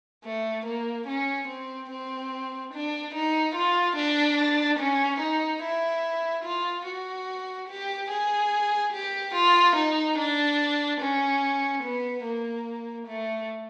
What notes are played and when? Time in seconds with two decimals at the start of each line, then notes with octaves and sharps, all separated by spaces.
0.25 A3
0.66 A#3
1.07 C#4
1.48 C4
1.90 C4
2.73 D4
3.15 D#4
3.55 F4
3.96 D4
4.79 C#4
5.20 D#4
5.63 E4
6.45 F4
6.87 F#4
7.69 G4
8.11 G#4
8.93 G4
9.35 F4
9.76 D#4
10.18 D4
11.01 C#4
11.84 B3
12.24 A#3
13.07 A3